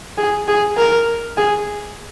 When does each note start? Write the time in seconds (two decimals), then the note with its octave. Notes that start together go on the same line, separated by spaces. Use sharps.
0.18 G#4
0.48 G#4
0.77 A#4
1.37 G#4